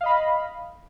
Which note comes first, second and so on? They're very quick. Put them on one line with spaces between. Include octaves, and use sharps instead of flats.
F5 D#5 B5